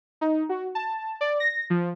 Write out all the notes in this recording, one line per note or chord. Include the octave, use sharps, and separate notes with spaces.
D#4
F#4
A5
D5
A#6
F3